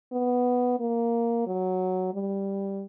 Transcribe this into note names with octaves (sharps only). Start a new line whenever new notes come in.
B3
A#3
F#3
G3